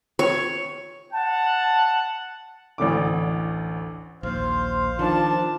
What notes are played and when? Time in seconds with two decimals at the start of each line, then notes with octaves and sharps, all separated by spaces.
0.19 C#5
1.13 F#5 A5
2.78 A1 D2 D3 D6
4.23 A#1 D#2 C5 F5
4.99 D#3 F3 D4 A5